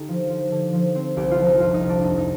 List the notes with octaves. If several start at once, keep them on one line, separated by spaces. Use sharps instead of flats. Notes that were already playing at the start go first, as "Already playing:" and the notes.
Already playing: D3 D#4 G4 A4
F3
F3
D3
F3
C4
C2 G4
F4
F3
D#4
G1 F4
D#4
C3
D4
F2 D#4
D#4